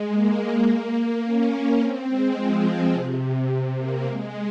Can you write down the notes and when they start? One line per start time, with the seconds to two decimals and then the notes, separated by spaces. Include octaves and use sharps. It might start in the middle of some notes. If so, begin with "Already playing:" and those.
Already playing: G#3
0.10 A#3
1.24 C#4
1.80 C4
2.08 G#3
2.37 F3
2.93 C3
3.50 C3
3.77 A#3
4.06 G#3